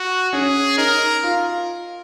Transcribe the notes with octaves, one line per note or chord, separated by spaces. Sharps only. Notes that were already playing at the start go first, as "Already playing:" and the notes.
Already playing: F#4
C#4 G#4
D#4 A#4
F4